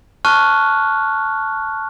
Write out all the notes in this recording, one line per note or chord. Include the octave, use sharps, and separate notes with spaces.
A5 C#6 F6 F#6